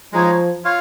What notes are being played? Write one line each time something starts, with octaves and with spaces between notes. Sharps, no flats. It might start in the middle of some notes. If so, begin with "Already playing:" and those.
F3 G#3 D#4 C#5
F4 C#5 F5